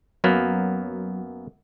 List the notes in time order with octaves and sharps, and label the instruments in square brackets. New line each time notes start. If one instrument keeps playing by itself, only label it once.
[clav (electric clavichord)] F#2 A#3 B3 [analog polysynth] F#3